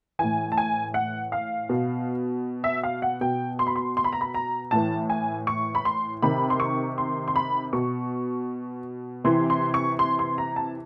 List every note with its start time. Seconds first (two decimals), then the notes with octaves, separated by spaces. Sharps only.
0.19 A2 E3 G#5
0.52 A5
0.58 G#5
0.94 F#5
1.32 F5
1.69 B2
2.64 E5
2.83 F5
3.02 F#5
3.21 B2 G5
3.59 C6
3.67 B5
3.76 C6
3.97 C6
4.04 B5
4.13 A#5
4.21 B5
4.34 A#5
4.71 A2 E3 A5
5.10 G#5
5.47 C#6
5.75 B5
5.85 C6
6.22 C3 D#3 B5
6.50 C6
6.60 C#6
6.98 C6
7.28 C6
7.36 B5
7.73 B2 C#6
9.24 C3 E3 C6
9.50 C6
9.74 C#6
9.99 C6
10.19 C6
10.38 A#5
10.56 A5